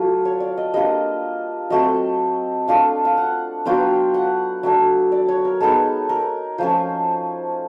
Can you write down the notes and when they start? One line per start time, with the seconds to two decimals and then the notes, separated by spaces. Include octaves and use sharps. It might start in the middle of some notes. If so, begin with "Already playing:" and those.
Already playing: F#3 A3 F4
0.25 C#5
0.40 D5
0.57 D#5
0.73 G3 A#3 D4 F4 D#5
1.70 F#3 A3 C4 D#5
2.68 A3 D4 F4 F5
3.05 F5
3.17 F#5
3.65 F#3 B3 D4 F4 G5
4.14 F#5
4.63 F#3 A3 D4 E5
5.12 D5
5.28 C#5
5.45 A#4
5.60 G#3 B3 D#4 A4
6.09 A#4
6.58 F3 A3 C#4 C5